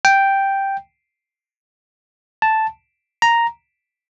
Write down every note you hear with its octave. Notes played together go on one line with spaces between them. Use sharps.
G5
A5
A#5